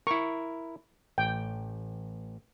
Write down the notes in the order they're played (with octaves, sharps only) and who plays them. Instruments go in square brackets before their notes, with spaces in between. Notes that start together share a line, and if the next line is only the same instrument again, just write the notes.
[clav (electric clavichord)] E4 A#4 [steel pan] C#6
[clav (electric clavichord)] A1 [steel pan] G5